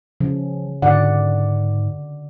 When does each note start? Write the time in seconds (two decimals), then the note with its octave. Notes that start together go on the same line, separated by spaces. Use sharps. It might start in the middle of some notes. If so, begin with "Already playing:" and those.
0.21 C#3 F3
0.82 G#2 D3 D5 F#5